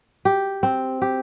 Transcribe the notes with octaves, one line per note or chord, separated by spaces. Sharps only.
G4
C4
G4